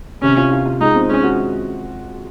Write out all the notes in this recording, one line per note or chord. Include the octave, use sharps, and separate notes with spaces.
C3 C#4
F4
F4
F4
G#3 D#4
C4
G#3 C#4
F#4